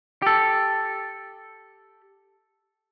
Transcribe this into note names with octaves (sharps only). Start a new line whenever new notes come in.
G4 A4